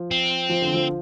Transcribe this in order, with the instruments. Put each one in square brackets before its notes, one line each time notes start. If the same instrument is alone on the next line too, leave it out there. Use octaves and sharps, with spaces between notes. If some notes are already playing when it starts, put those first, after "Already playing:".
Already playing: [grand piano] F3
[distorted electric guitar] C4
[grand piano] F3
D3
F3